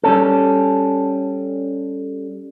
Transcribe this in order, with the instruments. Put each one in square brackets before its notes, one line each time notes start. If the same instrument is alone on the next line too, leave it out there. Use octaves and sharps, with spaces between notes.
[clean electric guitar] G3 C#4 A4